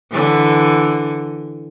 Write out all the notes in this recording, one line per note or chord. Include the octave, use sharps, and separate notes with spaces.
D3 E3